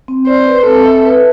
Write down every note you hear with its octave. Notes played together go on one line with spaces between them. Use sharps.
C4
C5 D5
B4
C4 A4
E5
B4